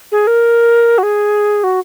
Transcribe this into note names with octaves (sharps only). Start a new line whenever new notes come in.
G#4
A#4
F#4
G#4
F#4